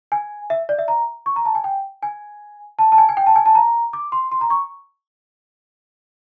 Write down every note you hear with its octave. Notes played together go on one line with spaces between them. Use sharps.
G#5
E5
D5
E5
A#5
C#6
A#5
A5
G#5
G5
G#5
A5
A5
G#5
G#5
G5
A5
G#5
A5
A#5
D6
C6
C6
A#5
C#6